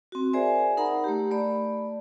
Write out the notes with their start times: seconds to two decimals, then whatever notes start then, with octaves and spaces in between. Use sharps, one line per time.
0.12 C4 F#4
0.33 G#4 A#4 C5 D5 E5 G#5
0.77 D#4 A#4 F#5 A#5 B5
1.04 A3 G4
1.31 A3 D5 B5